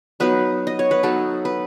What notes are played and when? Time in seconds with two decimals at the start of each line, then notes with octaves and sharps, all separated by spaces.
0.20 F#3 B3 D#4 B4
0.67 D#5
0.79 C#5
0.91 B4
1.03 F#3 B3 D#4 A4
1.45 B4